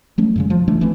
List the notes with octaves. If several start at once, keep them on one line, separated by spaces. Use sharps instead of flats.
F#3 A3 C#4
F#2 C#3 G#3
F3
E3 F#3 A3 D4
F1 E3 A3 C4